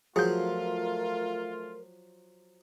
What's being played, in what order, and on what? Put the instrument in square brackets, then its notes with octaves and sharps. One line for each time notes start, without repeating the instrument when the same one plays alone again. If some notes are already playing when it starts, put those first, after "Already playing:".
[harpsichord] F3 F#3 [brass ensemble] A3 F4 [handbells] G#4 G6 [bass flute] A#4